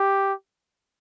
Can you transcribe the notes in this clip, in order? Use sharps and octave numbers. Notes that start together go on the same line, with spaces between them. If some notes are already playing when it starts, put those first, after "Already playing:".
Already playing: G4